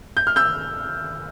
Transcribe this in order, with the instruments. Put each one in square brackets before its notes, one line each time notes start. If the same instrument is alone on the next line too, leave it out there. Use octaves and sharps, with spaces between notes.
[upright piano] G6
F6
E6 G6